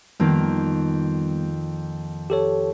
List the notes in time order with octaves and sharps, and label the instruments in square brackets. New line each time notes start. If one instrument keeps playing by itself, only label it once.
[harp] F2 D#3 A#3 [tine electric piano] G3 B3
[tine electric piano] G4 A4 C#5